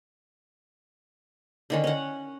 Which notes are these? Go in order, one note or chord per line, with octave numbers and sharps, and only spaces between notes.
D3 D#3 C#4
C#4 F#5